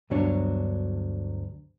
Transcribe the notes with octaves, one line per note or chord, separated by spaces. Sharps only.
D2 G2 B2 F#3 D4 C#5